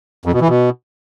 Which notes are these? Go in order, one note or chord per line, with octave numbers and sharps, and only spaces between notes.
F2
B2
E3
B2